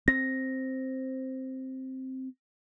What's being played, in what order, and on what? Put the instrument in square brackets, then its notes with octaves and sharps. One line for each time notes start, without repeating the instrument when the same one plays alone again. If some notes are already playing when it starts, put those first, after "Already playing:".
[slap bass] C4 [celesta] A#6